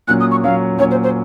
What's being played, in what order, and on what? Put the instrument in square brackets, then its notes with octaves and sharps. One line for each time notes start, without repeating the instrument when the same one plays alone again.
[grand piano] A#2 F#3 C#4 [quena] F#6
[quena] D#6
C#6
[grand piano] A#2 F#3 C#4 [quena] F5
[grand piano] A#2 F#3 C#4 [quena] C#5
[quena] C5
C5